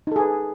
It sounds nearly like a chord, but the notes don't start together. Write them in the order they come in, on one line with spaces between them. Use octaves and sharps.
D#4 A4 G#4 B4